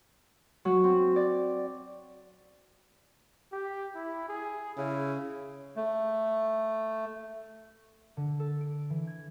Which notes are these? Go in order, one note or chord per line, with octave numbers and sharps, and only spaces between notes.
F#3
C4
D5
G4
E4
G#4
C#3 E4
A3
D3
A4
D7
E3
G#6